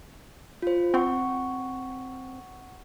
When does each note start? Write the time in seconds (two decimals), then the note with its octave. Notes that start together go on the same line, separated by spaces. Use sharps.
0.62 F4 C5
0.94 C4 F#5 C#6